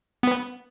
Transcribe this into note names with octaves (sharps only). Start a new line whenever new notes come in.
B3